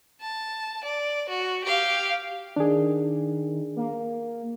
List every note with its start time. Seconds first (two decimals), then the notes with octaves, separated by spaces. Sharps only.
0.21 A5
0.84 D5
1.29 F#4
1.65 G4 F5
2.56 D#3 D4 G#4
3.76 A#3